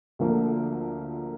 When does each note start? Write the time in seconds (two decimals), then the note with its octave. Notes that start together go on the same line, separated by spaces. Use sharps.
0.19 D2 D3 F3 A#3